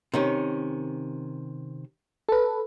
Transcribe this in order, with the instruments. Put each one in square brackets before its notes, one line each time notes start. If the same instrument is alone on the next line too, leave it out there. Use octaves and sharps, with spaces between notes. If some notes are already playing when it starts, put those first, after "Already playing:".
[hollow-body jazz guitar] C3 D#3 C#4
[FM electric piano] A4 B4